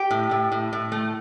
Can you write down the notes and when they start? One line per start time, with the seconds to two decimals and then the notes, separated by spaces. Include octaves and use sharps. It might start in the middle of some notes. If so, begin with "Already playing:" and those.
Already playing: G4 G5
0.11 A2
0.31 A2
0.52 A2
0.73 A2
0.92 A3